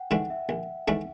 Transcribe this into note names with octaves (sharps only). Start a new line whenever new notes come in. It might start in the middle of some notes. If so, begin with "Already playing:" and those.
Already playing: F#5 G5
G#2 E3 A3 D4 F#5
E5
A#1
G#2 E3 A3 D4